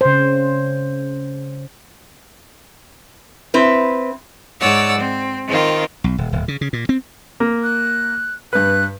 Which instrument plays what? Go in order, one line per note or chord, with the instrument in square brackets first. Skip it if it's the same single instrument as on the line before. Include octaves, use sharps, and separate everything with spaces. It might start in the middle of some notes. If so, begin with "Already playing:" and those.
[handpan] C#3 C5
[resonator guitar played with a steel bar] C4 E4 B4
[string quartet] G#2 C#5 D5 F#5 E6
C4
D#3 C4 F4
[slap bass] B1
D#1
D1
C#3
C#3
A#2
C4
[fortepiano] A#3
[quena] F#6
[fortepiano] G2 B4 [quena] F#6